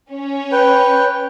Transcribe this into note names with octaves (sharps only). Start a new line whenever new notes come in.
C#4 C#5
B4 G5